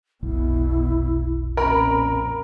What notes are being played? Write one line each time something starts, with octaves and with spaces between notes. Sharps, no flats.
F1 B1 B2 E4
F2 A#2 C#4 A#4 B5